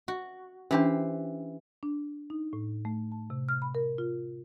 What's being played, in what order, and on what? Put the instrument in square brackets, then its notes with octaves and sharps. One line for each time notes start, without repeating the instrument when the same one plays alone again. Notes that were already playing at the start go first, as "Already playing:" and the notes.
[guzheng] F#4
[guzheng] E3 G4 C5 [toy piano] C#4 D4
[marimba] D4
D#4
A2
A3
A5
C3
F6
B5
A#4
F4